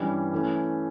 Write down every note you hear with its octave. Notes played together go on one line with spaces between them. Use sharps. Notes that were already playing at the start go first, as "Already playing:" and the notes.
Already playing: G2 E3 G3 C#4
E3 A3 C#4